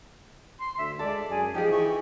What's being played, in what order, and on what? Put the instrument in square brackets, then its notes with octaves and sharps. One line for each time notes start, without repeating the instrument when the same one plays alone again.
[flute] C6
[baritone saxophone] D2 [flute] E5
[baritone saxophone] G#3 [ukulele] A4 [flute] D5
[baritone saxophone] F#2 [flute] G#4
[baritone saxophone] F3 [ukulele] D#4 G#4 [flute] G4
[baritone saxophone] E3 [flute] C#6